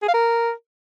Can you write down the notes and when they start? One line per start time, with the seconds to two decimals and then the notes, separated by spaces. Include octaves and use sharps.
0.03 G#4
0.08 F5
0.14 A#4